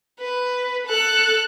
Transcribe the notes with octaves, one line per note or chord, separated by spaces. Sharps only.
B4
A4 F#6